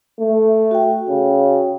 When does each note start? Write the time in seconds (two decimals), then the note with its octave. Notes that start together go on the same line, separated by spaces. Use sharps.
0.20 A3
0.71 F#4 G5
1.09 C#3